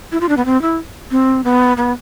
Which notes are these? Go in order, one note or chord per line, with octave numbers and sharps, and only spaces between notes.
E4
F4
D4
B3
C4
E4
C4
B3
B3